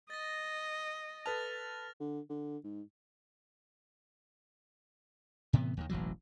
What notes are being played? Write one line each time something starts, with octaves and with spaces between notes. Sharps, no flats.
D#5 A6 A#6
A4 B4 A5 F6 A6 F7
D3
D3
G#2
A2 C3 E3 B3
D#2 D3 D#3
E1 A1 E3 F#3